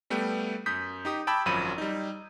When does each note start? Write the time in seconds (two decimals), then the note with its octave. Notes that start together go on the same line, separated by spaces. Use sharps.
0.10 G3 A3 B3 G5
0.66 F#2 D#6 G6 B6
1.05 D#4 G4 D#6
1.27 G5 A5 B5 D6 E6 G#6
1.46 G#1 F#2 F3 F#3 B5 D#7
1.78 G3 D#4